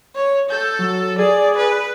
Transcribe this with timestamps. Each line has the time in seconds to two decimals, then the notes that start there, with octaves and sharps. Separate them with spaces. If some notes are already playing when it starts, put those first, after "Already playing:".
0.15 C#5
0.50 A4 G6
0.79 F#3
1.19 G#4 D5
1.57 B4